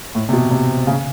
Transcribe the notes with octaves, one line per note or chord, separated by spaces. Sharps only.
A2
C3
B2
C3
C#3